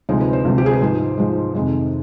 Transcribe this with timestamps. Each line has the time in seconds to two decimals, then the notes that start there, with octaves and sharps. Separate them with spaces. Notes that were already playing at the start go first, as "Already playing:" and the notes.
0.09 D2 C3 F3 G#3 D#4
0.21 B4
0.33 C5
0.45 D2 C3 F3 G#3
0.58 G4
0.66 G#4
0.73 B4
0.81 G#2 F3 G#3 C5
1.18 G#2 F3 G#3
1.55 F2 C3 D#3 G#3